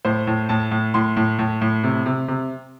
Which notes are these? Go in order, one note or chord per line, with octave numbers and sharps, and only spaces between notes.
A2 C5
A2
A2 A5
A2
A2 C6
A2
A2
A2
C3
C3
C3